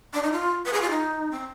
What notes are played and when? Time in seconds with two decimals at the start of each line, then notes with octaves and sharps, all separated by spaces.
0.14 D4
0.23 D#4
0.32 F4
0.65 B4
0.73 G#4
0.82 F4
0.90 D#4
1.31 C4